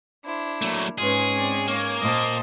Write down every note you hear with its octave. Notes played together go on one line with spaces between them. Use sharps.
D4 E4 C5
F#3 A3 A#3
G#2 G#3 C#4 F4 G#4 B4
C4 D5
A#3 C#5 G#5
A#2 C5 D#5 A5